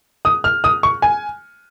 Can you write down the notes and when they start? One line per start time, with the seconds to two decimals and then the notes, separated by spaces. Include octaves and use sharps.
0.25 D#6
0.44 F6
0.64 D#6
0.83 C#6
1.02 G#5